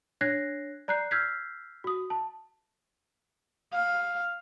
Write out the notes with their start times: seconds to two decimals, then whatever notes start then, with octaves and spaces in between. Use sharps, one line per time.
0.21 D4 C#5 F#6 G#6 A#6 C7
0.88 D5 A#5 F#6 G6 C7
1.11 E6 F6 G6 G#6 B6 C7
1.84 F#4 D#6
2.10 A5
3.73 F5